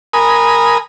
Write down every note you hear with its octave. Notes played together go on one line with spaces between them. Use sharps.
A#4 G#5 B5 D#6